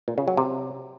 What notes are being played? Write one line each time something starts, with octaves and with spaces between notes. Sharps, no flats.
A#2
C#3
F#3
C3